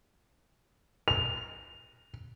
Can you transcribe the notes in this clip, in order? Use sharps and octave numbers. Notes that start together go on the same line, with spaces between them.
F7